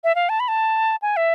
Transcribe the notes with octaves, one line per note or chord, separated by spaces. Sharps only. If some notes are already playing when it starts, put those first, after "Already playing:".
E5
F5
A5
B5
A5
G#5
E5